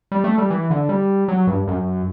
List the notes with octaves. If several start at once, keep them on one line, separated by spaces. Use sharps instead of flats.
G3
A3
G3
E3
D3
G3
F#3
G2
F#2